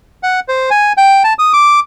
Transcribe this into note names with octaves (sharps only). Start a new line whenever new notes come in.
F#5
C5
G#5
G5
A5
D#6
D6